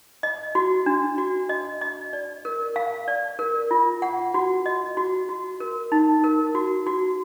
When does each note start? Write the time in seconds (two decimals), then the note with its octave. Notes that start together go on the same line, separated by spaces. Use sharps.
0.23 D#5
0.55 F#4
0.86 D4
1.18 F#4
1.49 D#5
1.81 D#5
2.13 D5
2.45 A#4
2.76 F5
3.08 D5
3.39 A#4
3.71 F4
4.02 F#5
4.34 F#4
4.66 D#5
4.97 F#4
5.29 F#4
5.60 A#4
5.92 D#4
6.24 A#4
6.55 F#4
6.87 F#4